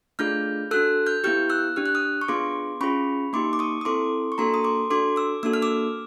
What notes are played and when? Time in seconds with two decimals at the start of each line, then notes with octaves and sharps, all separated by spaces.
0.19 A3 D4 F4 G#4 F6 G6
0.71 D4 F#4 A4 E6 F#6
1.06 F6 G6
1.24 B3 E4 G4 F6 G6
1.50 E6 F#6
1.76 D4 G4 F6
1.86 F#6
1.95 D#6 F6
2.21 C#6
2.28 B3 D4 F4 G#4 C6 D6
2.81 C#4 F4 G#4 B5 C#6
3.33 A#3 D#4 G4 C6 D6
3.53 D6
3.59 C#6 D#6
3.81 D#6
3.85 C4 E4 A4 C6 D6
4.32 C#6
4.38 A#3 D4 F#4 A4 A#5 C6
4.54 D#6
4.64 C6 D6
4.90 D4 F#4 A4 C6 D6
5.16 D6 E6
5.43 A#3 D4 F#4 A4 E6
5.54 F6
5.62 D6 E6